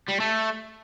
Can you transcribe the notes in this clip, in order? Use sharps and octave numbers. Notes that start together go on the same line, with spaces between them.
G3
A3